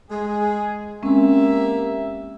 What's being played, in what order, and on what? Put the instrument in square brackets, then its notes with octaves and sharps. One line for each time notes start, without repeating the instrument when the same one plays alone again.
[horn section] G#3 G#4
[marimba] G#3 C4 C#4 [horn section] A#3 G4 E5